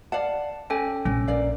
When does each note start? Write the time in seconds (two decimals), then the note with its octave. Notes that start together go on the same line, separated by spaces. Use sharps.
0.12 D5 F5 F#5 A5
0.70 C#4 A4 G5 G#5
1.05 A#1 C#4
1.28 A#4 D5 F5